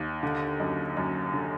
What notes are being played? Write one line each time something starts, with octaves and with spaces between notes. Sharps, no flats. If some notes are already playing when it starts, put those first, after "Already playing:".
Already playing: D#2
D3
F#2
F#2
D3